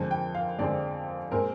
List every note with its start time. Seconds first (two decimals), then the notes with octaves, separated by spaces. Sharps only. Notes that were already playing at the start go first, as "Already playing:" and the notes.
Already playing: F2 D3 F3 G#3 C4 G#5
0.11 G5
0.35 F5
0.59 F2 D3 F3 G#3 C4 D5
1.31 A#2 G#3 C4 A#4